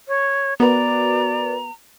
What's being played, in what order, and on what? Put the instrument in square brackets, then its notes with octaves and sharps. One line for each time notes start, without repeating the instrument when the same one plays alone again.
[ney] C#5
[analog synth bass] B3 [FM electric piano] F#4 A#4 B4 [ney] D5 [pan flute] A#5